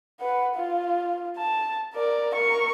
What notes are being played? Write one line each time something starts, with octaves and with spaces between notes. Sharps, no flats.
B4 F#5
F4
A5
A#4 D5
A#4 C#6